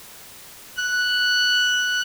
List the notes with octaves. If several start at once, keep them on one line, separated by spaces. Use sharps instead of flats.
F#6